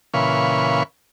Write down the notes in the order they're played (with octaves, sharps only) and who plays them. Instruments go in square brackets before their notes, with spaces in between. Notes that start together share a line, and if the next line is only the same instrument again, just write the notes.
[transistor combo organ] A#2 C#3 E3 B4 F5 C#6